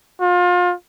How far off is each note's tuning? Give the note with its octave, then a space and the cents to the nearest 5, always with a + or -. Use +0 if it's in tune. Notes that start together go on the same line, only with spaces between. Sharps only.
F4 +30